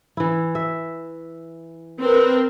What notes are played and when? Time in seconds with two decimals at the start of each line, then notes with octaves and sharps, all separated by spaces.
0.17 E3 E4
0.55 E5
1.99 C4 A#4 B4